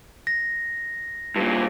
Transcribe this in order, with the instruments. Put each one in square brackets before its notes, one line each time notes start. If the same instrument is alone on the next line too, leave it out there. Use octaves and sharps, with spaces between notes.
[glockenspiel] A#6
[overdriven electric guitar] G2 A#2